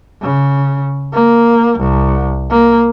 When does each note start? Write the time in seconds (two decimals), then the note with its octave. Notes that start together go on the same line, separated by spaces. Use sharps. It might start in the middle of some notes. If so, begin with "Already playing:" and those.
0.22 C#3
1.14 A#3
1.79 C2
2.51 A#3